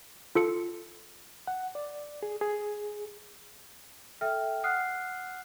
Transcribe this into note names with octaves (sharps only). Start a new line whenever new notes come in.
F4 A4 C#7
F#5
D5
G#4
G#4
A4 E5 G5 F6
F#5 D#6 F6 F#6 C7